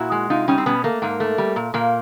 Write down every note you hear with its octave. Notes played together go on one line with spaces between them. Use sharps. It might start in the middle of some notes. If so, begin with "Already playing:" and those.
Already playing: A#2 E4 F#4
G#3
C3 D#4 F4
G3 C#4 D#4
C4
B2 B3 C#4
A3 A#3
G#2 A#3
A3
G3
A#2
A#2 A#3